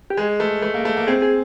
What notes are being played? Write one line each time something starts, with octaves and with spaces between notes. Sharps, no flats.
G4
G#3 G#4
A3
A3
A#3
A3
A#3
C4 G#4
G#4